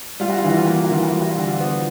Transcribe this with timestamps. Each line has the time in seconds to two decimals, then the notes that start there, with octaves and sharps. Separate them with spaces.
0.20 G3 F4
0.30 F#4
0.38 F4
0.44 E3 F#4
0.57 F4
0.65 A#3 F#4
0.76 F4
0.84 F#4
0.90 E3 F4
1.03 F#4
1.12 G3 F4
1.21 F#4
1.29 F4
1.37 D3 F#4
1.47 F4
1.60 B3